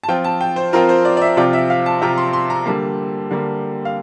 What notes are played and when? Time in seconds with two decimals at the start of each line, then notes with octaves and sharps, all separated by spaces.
0.03 A5
0.08 F3 C4 F4 G5
0.24 A5
0.41 G5
0.56 C5
0.73 F3 C4 F4 A#4
0.89 C5
1.05 D5
1.17 D5
1.22 E5
1.37 C3 F3 C4 F4 D5
1.53 E5
1.70 F5
1.86 A5
2.01 C3 F3 C4 F4 A#5
2.18 C6
2.33 C6
2.50 A#5
2.66 D3 G3 A#3 A5
3.31 D3 G3 A#3
3.85 F5